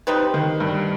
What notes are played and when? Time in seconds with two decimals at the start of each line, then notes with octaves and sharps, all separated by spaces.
0.07 G3 C4 D#4 B4
0.34 D#3
0.60 G2